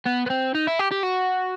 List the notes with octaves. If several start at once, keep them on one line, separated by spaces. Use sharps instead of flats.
B3
B3
C4
D#4
E4
G4
G4
F#4